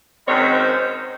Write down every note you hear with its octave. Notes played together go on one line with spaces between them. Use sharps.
F#2 D#3 G#3 C4 C#5
C5